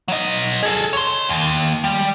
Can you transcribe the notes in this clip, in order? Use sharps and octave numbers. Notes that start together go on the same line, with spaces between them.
F#3 D#5
G#4 A4
C#5 C6
D#2
G3